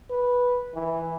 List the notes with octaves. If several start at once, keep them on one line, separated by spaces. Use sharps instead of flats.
B4
E3